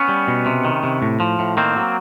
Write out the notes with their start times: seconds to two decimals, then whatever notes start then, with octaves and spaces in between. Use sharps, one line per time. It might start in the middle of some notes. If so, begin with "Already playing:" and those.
Already playing: B3 C#4
0.09 G3
0.28 B2
0.46 C3
0.65 D#3
0.83 C3
1.02 A2
1.20 F3
1.39 A2
1.57 D#3 A#3 C4
1.76 F#3